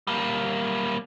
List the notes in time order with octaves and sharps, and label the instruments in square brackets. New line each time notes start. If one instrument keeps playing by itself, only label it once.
[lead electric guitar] G3 A#3